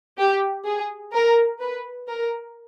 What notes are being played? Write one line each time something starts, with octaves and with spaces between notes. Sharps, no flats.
G4
G#4
A#4
B4
A#4